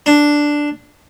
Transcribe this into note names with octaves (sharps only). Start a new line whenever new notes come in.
D4